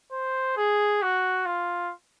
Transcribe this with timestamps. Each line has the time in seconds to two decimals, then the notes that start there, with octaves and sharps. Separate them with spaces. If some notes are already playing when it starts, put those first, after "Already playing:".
0.11 C5
0.57 G#4
1.02 F#4
1.45 F4